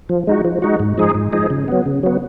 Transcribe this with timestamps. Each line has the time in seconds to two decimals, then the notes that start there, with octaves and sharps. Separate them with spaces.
0.09 F3
0.27 G#3 D#4 F#4
0.44 F3
0.62 G#3 D#4 F#4
0.80 G#2
0.98 F3 G#3 D#4 G#4
1.15 G#2
1.32 F3 G#3 D#4 G#4
1.50 C#3
1.68 F#3 B3
1.86 C#3
2.03 F#3 B3